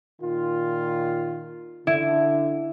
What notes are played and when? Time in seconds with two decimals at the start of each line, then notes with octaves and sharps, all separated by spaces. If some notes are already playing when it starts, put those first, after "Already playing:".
0.21 A#2 D#3 F4
1.87 D3 E4